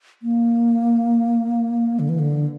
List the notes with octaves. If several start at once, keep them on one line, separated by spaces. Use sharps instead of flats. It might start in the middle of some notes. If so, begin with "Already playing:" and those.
A#3
D3
E3
D3